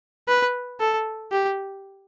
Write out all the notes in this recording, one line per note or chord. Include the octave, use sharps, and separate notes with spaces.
B4
A4
G4